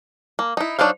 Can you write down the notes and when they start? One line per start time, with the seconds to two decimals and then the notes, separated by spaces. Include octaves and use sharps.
0.39 A#3
0.57 D#4 E4
0.79 F#3 D4 D#4 C5 F5